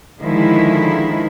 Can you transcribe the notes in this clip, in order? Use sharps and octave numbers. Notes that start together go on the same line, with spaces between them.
D3 D#3 F3 G#3 E4